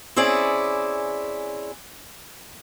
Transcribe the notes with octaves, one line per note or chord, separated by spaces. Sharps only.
C4 C#4 E4 G#4 D5